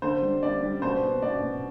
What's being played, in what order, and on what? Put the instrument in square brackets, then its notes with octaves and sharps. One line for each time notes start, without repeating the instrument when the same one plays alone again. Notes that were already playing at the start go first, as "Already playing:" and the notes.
[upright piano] D3 C5
G3
G3 D5
G3
B2 C5
B3
B2 D5
B2